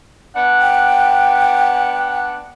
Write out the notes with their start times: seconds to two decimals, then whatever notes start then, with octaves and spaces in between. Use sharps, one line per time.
0.35 B3 D4 F#5
0.61 G5